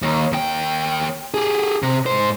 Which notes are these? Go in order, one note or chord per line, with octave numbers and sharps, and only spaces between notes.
D#2
D#2 G5
G4 G#4
C3
G#2 C5